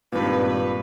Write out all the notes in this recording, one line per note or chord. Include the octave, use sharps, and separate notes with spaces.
G#1 G2 A#2 B4